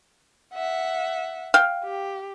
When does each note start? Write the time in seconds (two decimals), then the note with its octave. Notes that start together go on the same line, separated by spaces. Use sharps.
0.54 E5 F#5
1.54 F5 G5
1.84 G4